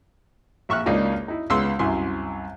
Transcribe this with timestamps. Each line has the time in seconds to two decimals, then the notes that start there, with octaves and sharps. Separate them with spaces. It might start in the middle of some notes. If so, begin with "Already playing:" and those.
0.69 A#1 E5 C#6 F6 F#6
0.86 C#2 A#3 D4 D#4 F4 D5
1.28 D#4 E4
1.50 C#2 G#3 B3 C6 E6
1.79 C2 F#2 E4 G#5 C6